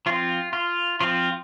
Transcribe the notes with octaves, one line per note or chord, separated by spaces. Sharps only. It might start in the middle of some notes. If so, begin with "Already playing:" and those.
F3 C4 F4
F4
F3 C4 F4